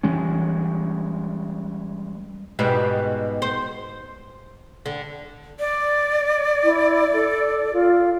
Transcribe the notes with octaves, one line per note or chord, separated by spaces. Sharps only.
E3 G3 G#3 C#4
G#2 B2 G3
C5
D3
D5
E4
A4
F4